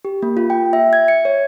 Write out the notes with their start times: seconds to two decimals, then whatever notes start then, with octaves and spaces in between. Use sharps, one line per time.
0.05 G4
0.22 A#3
0.37 F4
0.50 G5
0.73 E5
0.93 G#6
1.08 C#7
1.25 C#5